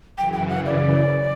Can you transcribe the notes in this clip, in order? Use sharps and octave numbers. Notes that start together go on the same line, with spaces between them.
F#2 C#3 E3 G5
G5
F#5
D5